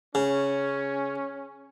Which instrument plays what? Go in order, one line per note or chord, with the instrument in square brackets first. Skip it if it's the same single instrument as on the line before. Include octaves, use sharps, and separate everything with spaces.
[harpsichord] C#3 [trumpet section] C#4